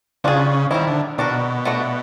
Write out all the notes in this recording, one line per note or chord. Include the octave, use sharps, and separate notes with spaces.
C#3 D4 F4 G#4
D#3 G3 C4 E4
D3
B2 D4 F#4 A#4
A3 D4 F#4